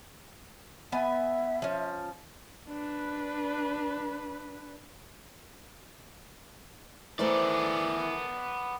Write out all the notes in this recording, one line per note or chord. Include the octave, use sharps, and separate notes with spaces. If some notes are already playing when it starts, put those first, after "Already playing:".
B3 E5 G#5
F3 C#4
D4 B4
E3 A3 B3 A#4 C5 D5